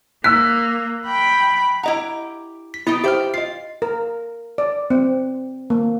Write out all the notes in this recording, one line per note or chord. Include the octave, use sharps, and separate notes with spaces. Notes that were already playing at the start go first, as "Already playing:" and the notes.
A#3 E6 F#6 B6
G5 B5
E4 G4 D#5 F#5 A#5
B6
B3 D#4 E4 G4
G4 C5 E5 G5 F6
F4 D#5 C7
A#4
D5
C4
A#3